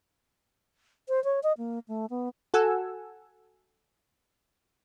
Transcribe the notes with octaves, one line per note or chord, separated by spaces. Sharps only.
C5
C#5
D#5
A#3
A3
B3
F#4 A4 F#5 G#5 E6